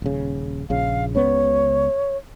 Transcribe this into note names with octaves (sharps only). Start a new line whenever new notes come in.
D#1 C#3
A#1 C#3 F5
C#2 C#3 B3 C#5